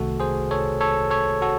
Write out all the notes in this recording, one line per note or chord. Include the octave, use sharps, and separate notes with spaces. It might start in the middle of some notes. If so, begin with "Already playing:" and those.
Already playing: C2 C3 D#3 A3 F#4 A4
G#4 C5
A4 C#5
A4 C#5
A4 C#5
F#4 A4